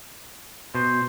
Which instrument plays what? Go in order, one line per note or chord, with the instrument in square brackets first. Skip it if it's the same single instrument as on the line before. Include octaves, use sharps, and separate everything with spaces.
[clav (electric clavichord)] B2 [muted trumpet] C5